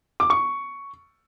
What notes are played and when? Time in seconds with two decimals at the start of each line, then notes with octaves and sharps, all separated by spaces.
0.20 D6
0.30 C#6